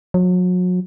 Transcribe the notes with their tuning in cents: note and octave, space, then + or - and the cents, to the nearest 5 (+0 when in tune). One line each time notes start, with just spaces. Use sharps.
F#3 -35